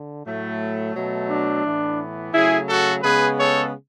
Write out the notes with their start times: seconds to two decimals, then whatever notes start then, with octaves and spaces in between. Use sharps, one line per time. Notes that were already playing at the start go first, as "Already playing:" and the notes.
Already playing: D3
0.26 A2 F#3 A3
0.95 B2 F#3 A3
1.30 D4
1.64 A2 E3 B3
2.34 C#3 F#3 A3 E4 G#4
2.69 F#4 A4
3.03 C#3 G#3 B3 G#4 B4
3.38 A4 C#5